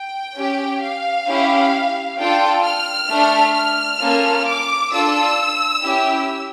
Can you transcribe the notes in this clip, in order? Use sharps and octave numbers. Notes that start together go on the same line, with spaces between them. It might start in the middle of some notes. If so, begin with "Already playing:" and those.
Already playing: G5
C#4 G4
F5
C#4 E4 G4
D4 F4 A4 G5
F6
A3 D4 A4
F6
A#3 C#4 F4 A4
D6
D4 F4 A4 E6
C#4 E4 G4